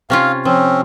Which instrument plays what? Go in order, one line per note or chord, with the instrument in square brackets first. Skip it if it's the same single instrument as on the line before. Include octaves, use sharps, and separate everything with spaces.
[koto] C3 C#4 F4 [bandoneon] F5
[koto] F3 [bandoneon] C4 C#4